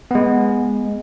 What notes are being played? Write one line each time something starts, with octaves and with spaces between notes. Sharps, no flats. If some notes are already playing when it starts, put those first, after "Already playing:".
G#3 B3